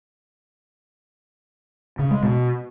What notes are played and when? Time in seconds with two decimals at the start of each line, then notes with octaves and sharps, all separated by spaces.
1.99 C#3
2.11 G#3
2.23 B2